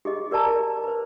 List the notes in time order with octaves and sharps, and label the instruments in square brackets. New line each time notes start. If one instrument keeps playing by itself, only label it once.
[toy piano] G4 G#4 D#5
G4 A#4 D5 A5 A#5
B4 C5